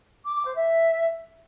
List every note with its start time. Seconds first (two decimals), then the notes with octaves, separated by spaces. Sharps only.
0.24 D6
0.35 D6
0.45 C5
0.55 E5